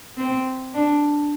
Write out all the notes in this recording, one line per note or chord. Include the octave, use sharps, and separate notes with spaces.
C4
D4